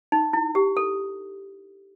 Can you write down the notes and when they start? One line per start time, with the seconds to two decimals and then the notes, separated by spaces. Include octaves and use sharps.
0.12 D#4
0.33 E4
0.55 G4
0.77 A4